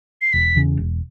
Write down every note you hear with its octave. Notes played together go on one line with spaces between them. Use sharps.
C7
E1 B6
E2 C#3
E1